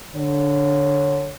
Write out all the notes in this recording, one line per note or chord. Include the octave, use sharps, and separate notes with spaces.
D3 C#5